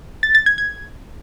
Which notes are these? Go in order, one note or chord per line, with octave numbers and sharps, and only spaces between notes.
A6
A6
G#6
G#6